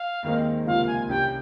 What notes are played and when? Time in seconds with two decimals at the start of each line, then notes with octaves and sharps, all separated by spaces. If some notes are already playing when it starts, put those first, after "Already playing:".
Already playing: F5
0.23 D#2 D#3 G#3 C4 D#4
0.66 C#2 C3 F3 A#3 F4 F5
0.87 G#5
1.09 C2 C3 G3 C#4 G5